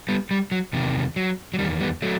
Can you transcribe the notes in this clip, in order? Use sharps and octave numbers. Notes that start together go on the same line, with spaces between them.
G3 B3
G3
F#3
E2 C3 D#3
F#3
F#3
E2 D#3 G3
G3 B3
F#3 A3